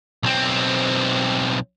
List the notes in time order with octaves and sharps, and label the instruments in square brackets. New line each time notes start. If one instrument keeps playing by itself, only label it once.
[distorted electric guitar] B1 C4